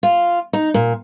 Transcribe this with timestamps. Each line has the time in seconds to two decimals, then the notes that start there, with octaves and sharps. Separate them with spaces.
0.03 F4
0.53 D#4
0.74 A#2